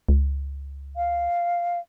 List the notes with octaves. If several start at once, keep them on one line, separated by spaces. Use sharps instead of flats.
C#2
F5